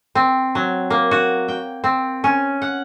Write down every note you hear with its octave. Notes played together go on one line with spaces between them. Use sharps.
C4
F#3
A#3
F#4
G5
C4
C#4
F#5